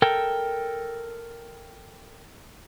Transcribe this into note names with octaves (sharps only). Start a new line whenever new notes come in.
A4 A#4 G5